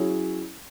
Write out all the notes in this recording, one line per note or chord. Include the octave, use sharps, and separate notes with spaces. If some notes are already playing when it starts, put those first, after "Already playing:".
Already playing: F#3 C#4 E4 G#4